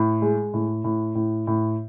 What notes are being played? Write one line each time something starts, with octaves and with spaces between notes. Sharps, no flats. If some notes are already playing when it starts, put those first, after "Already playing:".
Already playing: A2
G#3
A2
A2
A2
A2